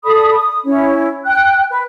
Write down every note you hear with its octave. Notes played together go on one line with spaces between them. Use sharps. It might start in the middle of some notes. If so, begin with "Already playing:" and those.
A4 D5 B5 D#6
D#6
C#4 E4 C#5
G5 F#6
B4